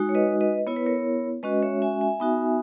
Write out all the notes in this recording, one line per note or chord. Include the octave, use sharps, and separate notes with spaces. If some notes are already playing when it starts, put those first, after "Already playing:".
Already playing: G#3 D#4 F#4
C#5
B4 D#5
B4 D#5
B3 E4 C#5
B4
A#4 C#5
G#3 C#4 F#4 B4 D#5
C#5 E5
E5 G#5
E5 G#5
B3 D#4 F#4